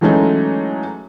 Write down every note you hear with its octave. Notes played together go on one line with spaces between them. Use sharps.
E3 F#3 G#3 A3 C#4 D#4